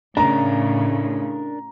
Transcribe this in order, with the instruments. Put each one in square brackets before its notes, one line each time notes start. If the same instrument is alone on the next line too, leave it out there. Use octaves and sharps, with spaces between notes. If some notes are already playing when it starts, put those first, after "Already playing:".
[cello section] A2 C#3 [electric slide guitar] D4 A#4 [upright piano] A#5